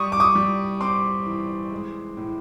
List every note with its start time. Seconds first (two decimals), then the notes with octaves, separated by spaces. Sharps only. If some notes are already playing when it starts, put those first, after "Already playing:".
Already playing: G3 C#6 D#6
0.12 D6
0.20 C#6 D#6
0.35 G3
0.80 C4 C6 D6
1.26 E3
1.72 G#3
2.17 A2